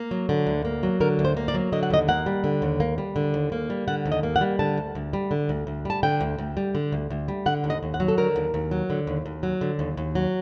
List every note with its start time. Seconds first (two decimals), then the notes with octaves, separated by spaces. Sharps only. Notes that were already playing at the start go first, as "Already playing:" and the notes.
Already playing: A#3
0.11 F#3
0.29 D3
0.47 D2
0.65 A#3
0.83 F#3
1.00 D3 A#4
1.19 D2
1.25 C5
1.37 A#3
1.48 D5
1.54 F#3
1.72 D3 D#5
1.83 F#5
1.90 D#2 D#5
2.08 A#3 F#5
2.26 G3
2.44 D3
2.62 D#2
2.80 A#3
2.98 G3
3.16 D3
3.34 D#2
3.52 A#3
3.70 G3
3.88 D3 F#5
4.06 D#2
4.12 D#5
4.23 A#3
4.36 F#5
4.41 G3
4.59 D3 A5
4.77 D2
4.95 D2
5.13 G3
5.31 D3
5.49 D2
5.67 D2
5.85 G3 A5
6.03 D3 G5
6.21 D2
6.38 D2
6.57 G3
6.75 D3
6.92 D2
7.10 D2
7.28 G3
7.46 D3 F#5
7.64 D#2
7.70 D#5
7.83 D#2
7.94 F#5
8.00 F#3
8.08 A4
8.18 D3 A#4
8.36 D#2
8.54 D#2
8.71 F#3
8.90 D3
9.07 D#2
9.26 D#2
9.43 F#3
9.61 D3
9.79 D#2
9.97 D#2
10.15 F#3